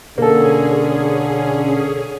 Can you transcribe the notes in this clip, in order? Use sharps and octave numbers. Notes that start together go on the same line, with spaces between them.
B2 D3 A#3 C#4 G#4 A4